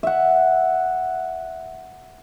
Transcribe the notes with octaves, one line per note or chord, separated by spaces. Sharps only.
E5 F#5